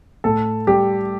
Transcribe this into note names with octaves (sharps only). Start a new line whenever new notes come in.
A2 A4
G3 G4